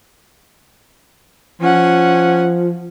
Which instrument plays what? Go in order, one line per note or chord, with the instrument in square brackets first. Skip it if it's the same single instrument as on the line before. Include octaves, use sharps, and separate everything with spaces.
[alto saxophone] F3 [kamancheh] C#4 F#5